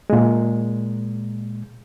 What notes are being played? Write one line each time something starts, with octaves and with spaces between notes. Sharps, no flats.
A#2 G#3